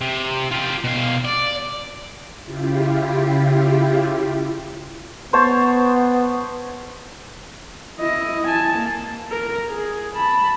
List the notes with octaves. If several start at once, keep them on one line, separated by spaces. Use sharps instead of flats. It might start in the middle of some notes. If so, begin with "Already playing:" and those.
C3
F4 G4
B2 F5
D5
C#3 E4 F4 G4
B3 C5 C#5 A5
E4 D#5
G#5 A5
A#3
A#4
G#4
A5 B5